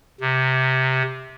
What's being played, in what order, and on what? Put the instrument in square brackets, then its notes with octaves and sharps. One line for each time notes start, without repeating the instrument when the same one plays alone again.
[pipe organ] C3